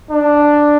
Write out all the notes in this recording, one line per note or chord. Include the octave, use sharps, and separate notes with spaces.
D4